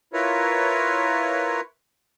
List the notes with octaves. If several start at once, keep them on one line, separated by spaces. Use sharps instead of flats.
E4 F4 A#4 B4 C#5